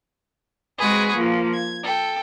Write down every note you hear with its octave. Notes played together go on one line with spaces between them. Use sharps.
G#3 C4 F#4 G#4 B4
F3 A#3
G#6
A4 G5